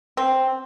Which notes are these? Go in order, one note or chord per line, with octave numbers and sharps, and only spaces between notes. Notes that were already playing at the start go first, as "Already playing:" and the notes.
C4